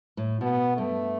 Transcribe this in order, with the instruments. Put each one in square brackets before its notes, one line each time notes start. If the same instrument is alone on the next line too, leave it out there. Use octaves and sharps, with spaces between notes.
[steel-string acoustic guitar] A2
[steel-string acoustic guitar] B2 [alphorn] B3
[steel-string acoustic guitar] G2 [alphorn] A3